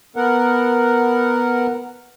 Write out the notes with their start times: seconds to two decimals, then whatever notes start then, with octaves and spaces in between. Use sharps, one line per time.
0.16 B3 A#4 F#5